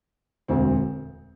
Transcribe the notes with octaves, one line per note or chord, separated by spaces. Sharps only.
E1 D2 D3 C4